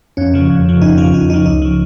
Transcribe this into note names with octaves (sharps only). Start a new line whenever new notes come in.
F2 C#4
C#3 F3
F2
C#3 F3
F2 D#4
C#3 F3 F4
F2 D#4
C#3 F3 D#4
C#2 D#4
C#3 F3